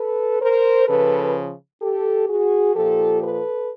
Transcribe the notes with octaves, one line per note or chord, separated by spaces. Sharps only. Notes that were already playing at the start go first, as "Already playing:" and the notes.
Already playing: A4 B4
A#4 C5
C#3 F3 A4 B4
G4 A4
F#4 G#4
A#2 F3 G4 A4
A4 B4